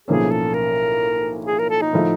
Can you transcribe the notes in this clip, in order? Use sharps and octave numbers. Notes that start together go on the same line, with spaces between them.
B1 A2 F3 A#3 C#4 G#4
A4
A#4
G#4
A#4
A4
D#4
A2 F3 A3